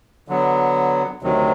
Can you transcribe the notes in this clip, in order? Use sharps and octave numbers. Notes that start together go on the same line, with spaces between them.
D3 F#3 B3
D2 C3 D#3 F#3